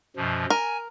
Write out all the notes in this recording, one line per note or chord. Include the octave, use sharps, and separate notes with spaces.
F#2 B2 F3
A#4 G#5